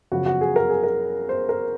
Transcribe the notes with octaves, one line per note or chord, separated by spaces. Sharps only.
F#2 C#3 F3 F#4
F#4
G#4
A#4
G#4
A#4
C5
A#4